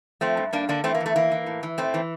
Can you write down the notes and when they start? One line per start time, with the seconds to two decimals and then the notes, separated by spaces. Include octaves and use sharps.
0.21 F3 A3 C4
0.37 G2
0.53 G2 A#3 D4
0.69 D3 A#3 D4
0.84 E3 A3 C4
0.95 A#3
1.00 E2
1.06 A3
1.16 E3 A#3
1.31 E3
1.47 A2
1.63 E3
1.78 A2 A3 C4
1.94 E3